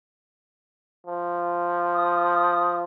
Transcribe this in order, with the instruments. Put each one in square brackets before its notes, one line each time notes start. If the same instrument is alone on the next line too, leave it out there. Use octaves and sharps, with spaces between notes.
[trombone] F3
[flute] D#6